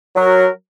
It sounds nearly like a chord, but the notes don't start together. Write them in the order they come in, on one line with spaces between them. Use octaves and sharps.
F#3 A#4 F#4